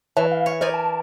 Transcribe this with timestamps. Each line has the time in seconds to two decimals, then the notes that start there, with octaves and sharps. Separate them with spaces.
0.17 E3 C#5 E5 A5
0.32 F5
0.46 C#5
0.61 A#4 C5 D5 D#5 G#5
0.74 A5